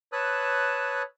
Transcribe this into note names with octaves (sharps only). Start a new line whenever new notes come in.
B4 C#5 A5 D#6 E6 F#6